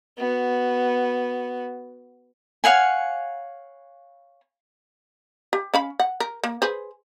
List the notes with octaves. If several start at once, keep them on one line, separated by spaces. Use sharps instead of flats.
B3 F#4
C#5 F5 F#5 G#5
G4
C#4 F5 B5
F#5
A#4
A#3
G#4 B4 C5